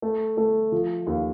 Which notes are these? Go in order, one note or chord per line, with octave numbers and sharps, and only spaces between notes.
A3
A3
F3
D#2